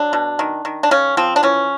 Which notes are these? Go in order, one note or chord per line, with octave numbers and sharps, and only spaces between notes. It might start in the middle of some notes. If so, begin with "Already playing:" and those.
Already playing: F#3 D4
B2
D#3
D#3
D4
C#3 C#4
F3 C4
D4
E3 C#4